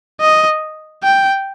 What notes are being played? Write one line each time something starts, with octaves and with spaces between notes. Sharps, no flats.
D#5
G5